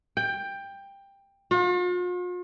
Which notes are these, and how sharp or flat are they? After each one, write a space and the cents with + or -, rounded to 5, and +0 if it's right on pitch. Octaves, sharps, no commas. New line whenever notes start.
G5 +15
F4 +45